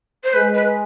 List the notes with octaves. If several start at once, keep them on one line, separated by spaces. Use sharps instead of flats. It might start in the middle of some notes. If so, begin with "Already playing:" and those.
C5
G#3 B4
B4